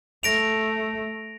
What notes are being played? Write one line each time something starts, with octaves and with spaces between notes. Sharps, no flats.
A3 A#6 D7 F7